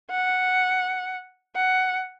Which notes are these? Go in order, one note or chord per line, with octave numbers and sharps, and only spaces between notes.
F#5
F#5